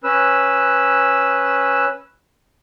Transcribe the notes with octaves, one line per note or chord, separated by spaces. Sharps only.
C#4 B4 E6